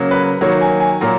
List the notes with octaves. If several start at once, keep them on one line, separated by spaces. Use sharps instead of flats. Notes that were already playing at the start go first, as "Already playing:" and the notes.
Already playing: C#3 F#3 A#3
B4
D#3 F#3 A#3 C#5
G#5
G#5
A#2 F#3 A#3 A#5